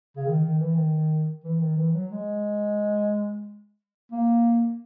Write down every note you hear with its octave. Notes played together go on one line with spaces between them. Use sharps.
C#3
D#3
D#3
E3
D#3
E3
D#3
E3
F#3
G#3
A#3